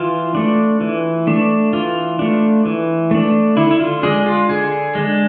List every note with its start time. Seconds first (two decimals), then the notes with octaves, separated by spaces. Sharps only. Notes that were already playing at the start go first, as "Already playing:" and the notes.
Already playing: E3 F4
0.35 A3 D4
0.81 E3
1.27 A3 D4
1.73 E3 F4
2.19 A3 D4
2.66 E3
3.11 A3 D4
3.57 D3 E4
3.71 E4
3.80 F4
4.03 G#3 D4 G#4
4.26 F4
4.49 D3 G#4
4.95 G#3 D4